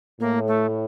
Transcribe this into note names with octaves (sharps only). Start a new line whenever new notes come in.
A2 A#3
A3